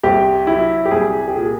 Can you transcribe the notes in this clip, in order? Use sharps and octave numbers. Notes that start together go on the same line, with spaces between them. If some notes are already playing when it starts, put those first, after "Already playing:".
C2 G4
F#3 E4
G4
C2 G#4
G4
A#2 G#4